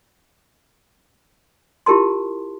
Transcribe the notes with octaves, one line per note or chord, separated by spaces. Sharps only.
E4 F4 G4 A#4 A5 C6